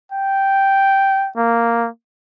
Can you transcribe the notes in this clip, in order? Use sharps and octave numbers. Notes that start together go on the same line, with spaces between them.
G5
A#3